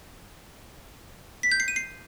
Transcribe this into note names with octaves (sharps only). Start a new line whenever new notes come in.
B6
G6
C7
D#7
C7